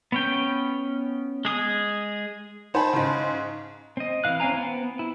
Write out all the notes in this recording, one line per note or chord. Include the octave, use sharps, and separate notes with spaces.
B3 C#4 G5
G#3 G#4 D#6
D#4 C5 G#5 A5 B5
G#2 C#3
C4 D#5
E3 F5 F#6
C4 C#4 F5 G#5 A#5
B3 C4
E4